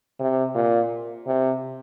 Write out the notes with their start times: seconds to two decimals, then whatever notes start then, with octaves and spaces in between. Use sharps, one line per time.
0.20 C3
0.55 A#2
1.27 C3